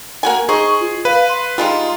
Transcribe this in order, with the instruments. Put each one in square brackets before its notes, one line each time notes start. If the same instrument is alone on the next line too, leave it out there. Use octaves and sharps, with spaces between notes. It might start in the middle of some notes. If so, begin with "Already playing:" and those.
[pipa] A#3 F#4 G#5
[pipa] D#4 C5 [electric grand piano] G#4 [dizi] C#6
[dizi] F4
[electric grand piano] B4 [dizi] F5
[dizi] C6
[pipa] G3 G#3 D#4 [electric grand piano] F4